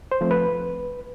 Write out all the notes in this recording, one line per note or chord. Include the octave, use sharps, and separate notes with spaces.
C5
F3 A3 C4
B4